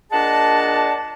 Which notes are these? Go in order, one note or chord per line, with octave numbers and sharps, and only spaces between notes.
A#2 D4 G#4 D#5 F#5 A5